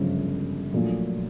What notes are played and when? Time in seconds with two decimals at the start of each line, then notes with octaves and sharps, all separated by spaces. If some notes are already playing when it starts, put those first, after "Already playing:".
Already playing: G1 F#2 C#3 F3 G#3
0.73 A#1 A#2 F#3 A3